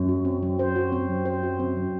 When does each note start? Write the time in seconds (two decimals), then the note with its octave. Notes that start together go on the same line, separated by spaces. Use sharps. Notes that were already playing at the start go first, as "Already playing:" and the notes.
Already playing: F#2
0.09 F#4
0.25 C4
0.43 F#3
0.59 C5
0.76 F#4
0.92 C4
1.10 F#3
1.25 C5
1.43 F#4
1.60 C4
1.76 F#3